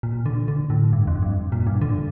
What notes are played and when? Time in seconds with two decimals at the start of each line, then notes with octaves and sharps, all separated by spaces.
0.03 A#2
0.26 D3
0.48 D3
0.70 A2
0.93 G2
1.07 F2
1.22 G2
1.52 A#2
1.67 G2
1.82 D3